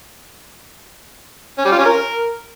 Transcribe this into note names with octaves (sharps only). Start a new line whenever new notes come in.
C#4
G3
F4
C#4
A#4